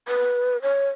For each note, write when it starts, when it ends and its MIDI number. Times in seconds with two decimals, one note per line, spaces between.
0.08 0.60 71
0.62 0.88 73